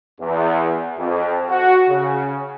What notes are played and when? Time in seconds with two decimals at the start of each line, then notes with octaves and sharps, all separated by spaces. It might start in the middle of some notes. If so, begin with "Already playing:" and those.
0.21 E2
0.98 F2
1.50 F#4
1.88 C#3